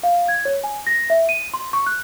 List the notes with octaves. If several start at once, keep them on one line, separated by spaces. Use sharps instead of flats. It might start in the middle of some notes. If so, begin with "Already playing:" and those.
F5
G#6
C#5
G#5
A#6
E5
D#7
C6
C#6
F#6